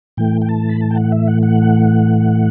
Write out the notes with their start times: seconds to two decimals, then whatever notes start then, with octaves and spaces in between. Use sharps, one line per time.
0.17 A2 E3 A3 G5
0.42 G5
0.49 A5
0.69 B5
0.81 A5
0.91 G5
0.96 F#5
1.12 E5
1.28 F#5
1.43 F#5